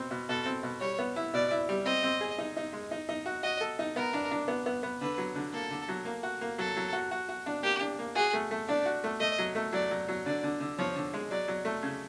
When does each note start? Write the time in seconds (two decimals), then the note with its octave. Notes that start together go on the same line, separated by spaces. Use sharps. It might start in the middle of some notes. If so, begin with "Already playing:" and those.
Already playing: B2 C4
0.11 B2
0.29 B2 A4
0.45 C4
0.63 B2
0.81 G3 C#5
0.98 B3
1.16 E4
1.34 B2 D5
1.51 E4
1.69 G3
1.85 C4 D#5
2.03 C4
2.21 G#4
2.38 D#4
2.57 D#4
2.73 G#3
2.91 D#4
3.09 D#4
3.26 F#4
3.43 F#4 D#5
3.61 A4
3.79 D#4
3.96 B3 A#4
4.13 D4
4.31 D4
4.48 B3
4.66 B3
4.83 B3
5.01 D3 B4
5.18 F#3
5.35 D3
5.53 A#3 A4
5.71 D3
5.88 F#3
6.05 A#3
6.23 F#4
6.41 A#3
6.58 F#3 A4
6.76 F#3
6.93 F#4
7.11 F#4
7.29 F#4
7.46 D4
7.63 A#3 G4
7.80 D4
7.99 A#3
8.16 F#4 G#4
8.33 A3
8.51 A3
8.68 D4 D5
8.85 F#4
9.04 A3
9.20 A3 D#5
9.38 F#3
9.55 A3
9.73 F#3 D5
9.91 F#3
10.08 F#3
10.26 D3 D5
10.43 D3
10.60 D3
10.78 F3 C#5
10.96 D3
11.14 G#3
11.31 F#3 D5
11.48 F#3
11.65 A3
11.83 C#3